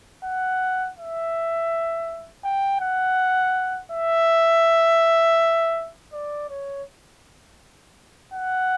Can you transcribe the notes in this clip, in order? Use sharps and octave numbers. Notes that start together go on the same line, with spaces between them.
F#5
E5
G5
F#5
E5
D5
C#5
F#5